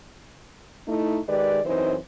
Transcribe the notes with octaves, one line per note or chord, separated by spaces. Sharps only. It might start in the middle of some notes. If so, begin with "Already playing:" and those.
A3 D#4 E4
D#3 G#3 G4 B4 D5
F#2 E3 C4 D#4 C5